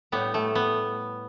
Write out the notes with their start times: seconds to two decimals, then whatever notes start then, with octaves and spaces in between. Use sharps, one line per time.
0.12 A2 G3 B3
0.34 A3
0.55 B3